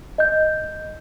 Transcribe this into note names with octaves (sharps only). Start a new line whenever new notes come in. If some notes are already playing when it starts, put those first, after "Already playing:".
D#5 G6